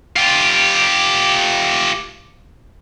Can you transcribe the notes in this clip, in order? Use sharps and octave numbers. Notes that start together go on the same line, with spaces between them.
F4 G4